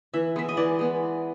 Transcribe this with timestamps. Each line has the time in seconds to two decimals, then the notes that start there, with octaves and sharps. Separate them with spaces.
0.14 E3 E5
0.36 G#3 B3 E5
0.49 D#5
0.57 E3 D5
0.79 G#3 B3